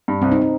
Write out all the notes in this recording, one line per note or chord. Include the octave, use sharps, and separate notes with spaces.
G2
C2 C4
D#4
C4